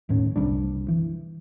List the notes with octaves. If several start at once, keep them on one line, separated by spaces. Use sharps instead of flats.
F#1 D#2 A2 C#4
F#1 C2 G3 D4
E3